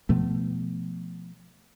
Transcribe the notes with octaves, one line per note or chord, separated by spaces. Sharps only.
B2 F3 A3 B3